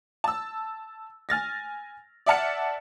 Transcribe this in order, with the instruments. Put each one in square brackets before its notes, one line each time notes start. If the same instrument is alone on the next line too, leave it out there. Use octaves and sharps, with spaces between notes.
[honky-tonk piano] A5 E6
G#5 F6 A6 A#6
D5 E5 F#5 A5 F6 C#7